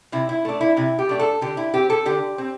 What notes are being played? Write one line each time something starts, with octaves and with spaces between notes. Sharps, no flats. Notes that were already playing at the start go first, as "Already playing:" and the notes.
C3 E4
E4
A3 D4
E4
C3 E4
G4
A3 D4
A4
D3 G4
E4
C4 G4
A4
D3 G4
C4